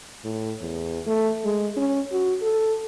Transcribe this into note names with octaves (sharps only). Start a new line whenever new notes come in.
A2
E2
A3
G#3
C#4
F#4
A4